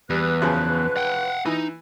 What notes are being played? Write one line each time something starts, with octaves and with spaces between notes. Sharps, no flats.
E2 G3 B4 F#6
F#2 C#3 F3
F#5 G5
E3 D#4